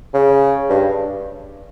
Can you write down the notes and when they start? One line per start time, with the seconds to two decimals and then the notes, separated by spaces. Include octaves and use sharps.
0.14 C#3
0.70 G2